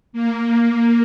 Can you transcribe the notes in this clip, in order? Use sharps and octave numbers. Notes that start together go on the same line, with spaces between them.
A#3